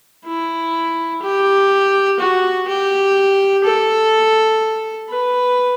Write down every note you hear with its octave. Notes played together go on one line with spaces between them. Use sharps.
E4
G4
F#4
G4
A4
B4